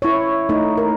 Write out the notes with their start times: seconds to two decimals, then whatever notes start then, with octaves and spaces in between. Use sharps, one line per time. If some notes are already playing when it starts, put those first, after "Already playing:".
0.02 E4 C#5
0.49 A3 D#4
0.77 A#4